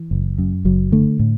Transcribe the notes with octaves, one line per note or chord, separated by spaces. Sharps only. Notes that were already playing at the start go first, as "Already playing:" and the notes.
Already playing: E3
F#1
F#2
F#1 F#3
D3 A3
A2